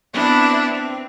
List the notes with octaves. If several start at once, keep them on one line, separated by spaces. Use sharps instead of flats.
B3 C4 D4 E4 B4
C4